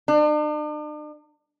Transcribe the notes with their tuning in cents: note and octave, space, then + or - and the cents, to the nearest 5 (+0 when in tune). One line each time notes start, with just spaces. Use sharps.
D4 +45